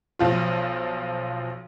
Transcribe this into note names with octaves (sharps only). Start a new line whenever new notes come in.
B1 F3 F4